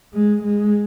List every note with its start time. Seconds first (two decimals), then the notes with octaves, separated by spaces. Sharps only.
0.14 G#3
0.43 G#3